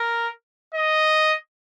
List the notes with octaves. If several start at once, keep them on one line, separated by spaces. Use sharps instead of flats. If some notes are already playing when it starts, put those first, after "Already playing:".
Already playing: A#4
D#5